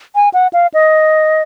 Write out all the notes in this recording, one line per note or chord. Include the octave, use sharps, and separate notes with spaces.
G#5
F#5
F5
D#5